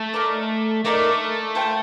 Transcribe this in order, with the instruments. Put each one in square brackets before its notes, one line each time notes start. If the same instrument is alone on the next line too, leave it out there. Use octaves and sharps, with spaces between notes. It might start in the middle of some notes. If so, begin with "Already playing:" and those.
Already playing: [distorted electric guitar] A3
[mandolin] A#3 D#4 A#4 D5
[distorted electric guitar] A3 [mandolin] A#3 D#4 A#4 D5
[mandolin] F4 A4 C5 G5